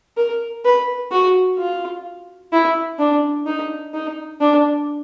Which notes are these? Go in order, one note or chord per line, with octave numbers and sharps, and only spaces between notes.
A#4
B4
F#4
F4
E4
D4
D#4
D#4
D4